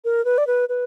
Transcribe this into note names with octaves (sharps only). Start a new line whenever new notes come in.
A#4
B4
D5
B4
B4